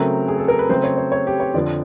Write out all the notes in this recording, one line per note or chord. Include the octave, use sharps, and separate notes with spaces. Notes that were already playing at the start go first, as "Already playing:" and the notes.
Already playing: C#3 F#3 A3 C4 A#4
G#4
A4
A#4
B4
C#3 F#3 A3 C4 C5
C#5
C#5
C#5
G4
C#5
F2 D3 F3 D5